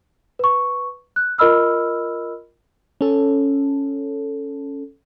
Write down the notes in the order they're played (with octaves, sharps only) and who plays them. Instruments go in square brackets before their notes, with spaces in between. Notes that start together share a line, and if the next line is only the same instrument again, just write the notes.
[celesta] B4 C#6
F#6
F4 A#4 D#5 B5 E6 F6
[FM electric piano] C#4 A4